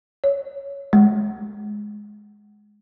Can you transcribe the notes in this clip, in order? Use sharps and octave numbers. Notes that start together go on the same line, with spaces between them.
C#5
G#3